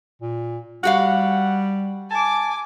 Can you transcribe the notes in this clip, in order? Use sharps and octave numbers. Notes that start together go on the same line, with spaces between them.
A#2
G3 F#4 G4 F5 F#5
G#5 A5 D6